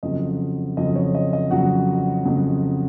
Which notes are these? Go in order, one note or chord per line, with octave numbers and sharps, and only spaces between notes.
F2 C#3 F#3 D#5
F2 C#3 F#3 D#5
C#5
D#5
D#5
F2 C#3 F#3 F#4 F#5
F2 C#3 F#3